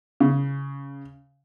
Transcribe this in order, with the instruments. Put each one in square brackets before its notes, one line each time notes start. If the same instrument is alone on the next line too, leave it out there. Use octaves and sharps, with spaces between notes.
[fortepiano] C#3